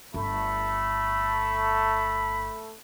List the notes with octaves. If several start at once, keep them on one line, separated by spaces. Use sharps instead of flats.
G1 A3 B5